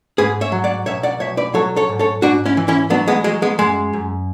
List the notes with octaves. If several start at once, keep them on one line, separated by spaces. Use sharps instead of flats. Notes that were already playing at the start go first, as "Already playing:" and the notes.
G#2 G#4 B4
C#5 E5
F#3
D5 F#5
B1 C#5 E5
D5 F#5
B1 C#5 E5
B4 D5
F#3 A4 C#5
A4 C#5
G#2
A4 C#5
G#2 D4 F#4
C#4 E4
E3
C#4 E4
F#3 B3 D4
G#3 B3
F#3 G#3
G#3 B3
F#2 G#3
F#2